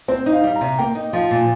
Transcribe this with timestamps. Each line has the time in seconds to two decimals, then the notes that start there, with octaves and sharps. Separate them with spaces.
0.08 C4 C5
0.26 D#4
0.32 F5
0.44 G3
0.55 A#5
0.61 C3
0.78 A#3 G5
0.95 D#4
1.13 F3 F5
1.31 A#2